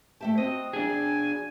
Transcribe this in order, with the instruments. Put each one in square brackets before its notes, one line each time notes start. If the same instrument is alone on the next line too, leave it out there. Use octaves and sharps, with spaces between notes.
[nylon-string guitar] A3 E5 A5 [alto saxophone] G4
[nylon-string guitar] C4 F#4 [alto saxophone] D#5
[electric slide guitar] D4 G#4 [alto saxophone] G#5